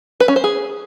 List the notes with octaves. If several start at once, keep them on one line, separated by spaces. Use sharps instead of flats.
B4
C#4
C5
G#4